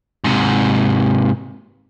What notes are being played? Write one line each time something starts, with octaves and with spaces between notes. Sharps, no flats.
G#2 C3